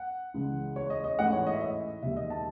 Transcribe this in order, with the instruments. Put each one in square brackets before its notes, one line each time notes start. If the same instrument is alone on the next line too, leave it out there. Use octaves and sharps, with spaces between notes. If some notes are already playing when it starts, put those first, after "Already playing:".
Already playing: [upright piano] F#5
C#2 C#3 E3 G#3
C#5
D#5
D#5
A1 G#2 E3 A3 F#5
C#5
D#5
E5
D#5
E1 D#2 D#3 G#3 E5
D#5
A5